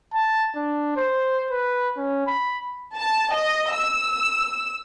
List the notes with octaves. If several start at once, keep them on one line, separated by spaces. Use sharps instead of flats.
A5
D4
C5
B4
C#4
B5
A5
D#5
E6